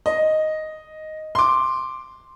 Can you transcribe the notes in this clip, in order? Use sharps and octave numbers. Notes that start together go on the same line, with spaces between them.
D#5
C6 D6